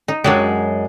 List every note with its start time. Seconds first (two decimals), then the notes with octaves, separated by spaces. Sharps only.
0.08 D#4
0.24 F#2 F#3 G#3 D4 G4